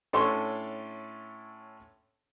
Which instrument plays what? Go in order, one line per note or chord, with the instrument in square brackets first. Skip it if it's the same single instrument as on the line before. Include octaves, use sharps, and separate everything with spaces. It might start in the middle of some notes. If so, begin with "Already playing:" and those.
[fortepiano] A2 C#4 D4 A4 C6 C#6